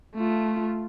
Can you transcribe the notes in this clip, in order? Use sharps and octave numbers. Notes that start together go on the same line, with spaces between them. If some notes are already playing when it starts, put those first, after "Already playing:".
A3 F4